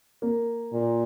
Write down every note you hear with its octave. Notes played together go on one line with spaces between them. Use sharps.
A#3
A#2